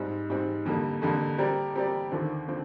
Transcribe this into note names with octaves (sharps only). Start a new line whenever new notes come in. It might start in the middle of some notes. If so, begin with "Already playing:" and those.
Already playing: G#2 G3 C4
G#2 G3 C4
F2 D3 G3 A#3
F2 D3 G3 A#3
G3 C4 G4 A#4 D5
G3 C4 G4 A#4 D5
D#2 D3 F3 C4
D3 F3 C4